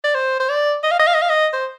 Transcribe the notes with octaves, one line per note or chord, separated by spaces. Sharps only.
D5
C5
C5
D5
D#5
F5
D#5
F5
D#5
F5
D#5
C5